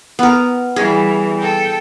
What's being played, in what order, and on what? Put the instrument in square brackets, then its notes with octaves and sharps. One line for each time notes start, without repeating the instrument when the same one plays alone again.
[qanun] B3 A#4
[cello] E3 G3 [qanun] G#4
[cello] A4 G5